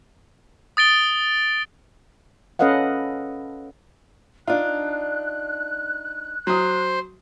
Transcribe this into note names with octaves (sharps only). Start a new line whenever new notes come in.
D#6 A6 D7 G7
C#4 A4 B4 D#5 F5 F#5
D4 D#4 F4 F#6
F#3 C5 D#6